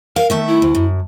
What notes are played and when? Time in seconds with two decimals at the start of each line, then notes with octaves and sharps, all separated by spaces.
0.16 A#4 F5
0.30 D#3 A3 E5
0.47 E4
0.62 D2
0.75 F#2